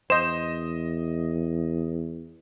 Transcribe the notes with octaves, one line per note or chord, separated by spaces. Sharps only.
E2 C5 D#5 E7